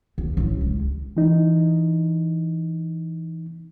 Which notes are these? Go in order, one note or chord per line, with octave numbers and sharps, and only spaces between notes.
D#2
A1
C#2
E3 D#4